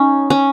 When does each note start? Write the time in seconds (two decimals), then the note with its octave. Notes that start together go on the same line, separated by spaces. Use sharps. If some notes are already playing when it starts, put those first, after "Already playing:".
Already playing: C#4 D#4
0.30 C#4